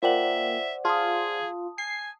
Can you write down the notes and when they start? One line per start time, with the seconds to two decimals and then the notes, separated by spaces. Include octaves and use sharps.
0.03 A#3 F4 C5 D5 E5 F#5 G5 F#7
0.85 F4 G#4 A5 D#6
1.78 G#5 C7